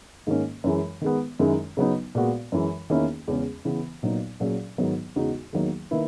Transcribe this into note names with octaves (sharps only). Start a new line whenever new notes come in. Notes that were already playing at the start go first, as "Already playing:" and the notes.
G#2 D#3 A#3 C#4
F#2 E3 G#3
D#3 G#3 B3
F#2 D#3 G#3 C#4 E4
C#3 F#3 B3 D#4
A#2 G#3 B3 F#4
F#2 E3 G#3
E2 D#3 A#3 C#4 E4
E2 C#3 G#3 C#4
C#3 E3 B3
A#2 F#3 B3 D#4
A#2 F#3 C#4 G#4
G#2 D#3 F#3 B3
E2 C#3 G#3 D#4 F#4
E2 D#3 F#3 A#3
D#3 A#3 E4 B4